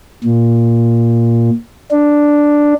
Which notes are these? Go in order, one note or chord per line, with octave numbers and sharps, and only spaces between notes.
A#2
D4